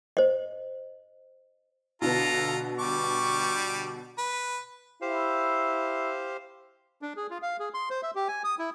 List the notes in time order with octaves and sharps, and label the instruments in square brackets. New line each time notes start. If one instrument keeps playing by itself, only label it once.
[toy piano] C5 D#5
[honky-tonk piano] B2 D3 B3 [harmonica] F4 A4 A#5
[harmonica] G3 C#6 D6
B4
[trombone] E4 [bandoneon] G4 C5 F5
[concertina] D4
G#4
F4
F5
G#4
C6
C5
E5
G4
G#5
D#6
E4